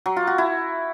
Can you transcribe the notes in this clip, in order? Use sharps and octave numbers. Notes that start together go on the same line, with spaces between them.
F#3
F4
F#4
E4